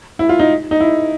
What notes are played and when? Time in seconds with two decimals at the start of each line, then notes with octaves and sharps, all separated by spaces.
0.19 E4
0.29 F4
0.39 D#4
0.71 D#4
0.80 E4